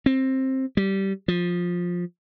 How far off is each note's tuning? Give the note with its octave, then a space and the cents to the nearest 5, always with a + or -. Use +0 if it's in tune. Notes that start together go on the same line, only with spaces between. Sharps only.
C4 +15
G3 -15
F3 +10